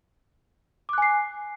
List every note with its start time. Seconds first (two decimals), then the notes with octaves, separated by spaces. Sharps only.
0.89 D6
0.93 F#6
0.98 G#5
1.02 C7